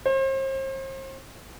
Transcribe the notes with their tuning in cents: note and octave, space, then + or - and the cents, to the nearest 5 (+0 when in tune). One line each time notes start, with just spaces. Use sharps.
C5 +40